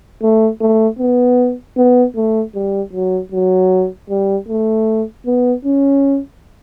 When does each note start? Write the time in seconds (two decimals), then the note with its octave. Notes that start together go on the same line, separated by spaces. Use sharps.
0.22 A3
0.61 A3
0.99 B3
1.77 B3
2.16 A3
2.55 G3
2.93 F#3
3.32 F#3
4.10 G3
4.49 A3
5.26 B3
5.65 C#4